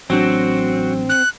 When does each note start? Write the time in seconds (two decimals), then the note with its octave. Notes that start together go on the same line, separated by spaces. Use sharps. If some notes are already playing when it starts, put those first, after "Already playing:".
0.10 A1 F#3 C4 D4 F#4
1.09 F#6